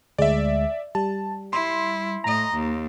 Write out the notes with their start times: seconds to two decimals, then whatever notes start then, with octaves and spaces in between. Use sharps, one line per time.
0.18 D2 G#3 D5 E5
0.95 G3 A5
1.53 E4 C6
2.24 A2 D#5 A#5
2.53 D#2